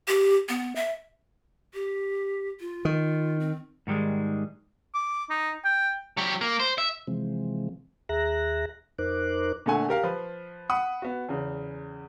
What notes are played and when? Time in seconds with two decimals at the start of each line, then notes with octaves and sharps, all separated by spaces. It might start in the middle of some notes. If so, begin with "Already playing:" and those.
0.08 G4
0.49 B3
0.76 E5
1.74 G4
2.60 F4
2.85 D#3
3.40 C4
3.87 G#2 D#3 G3 G#3
4.94 D6
5.30 D#4
5.65 G5
6.17 F#3 G4
6.41 A#3
6.60 C5
6.78 E5
7.07 C3 E3 F3 G#3 C4
8.09 D#2 G#4 E5 A#5 F#6 A#6
8.98 F2 D#4 A#4 C5 D6 F#6
9.66 A#2 D3 A3 F#5 G#5
9.89 G4 A#4 F5
10.03 F3 B4
10.70 F#5 B5 D#6
11.02 B3 F#4
11.29 E2 C#3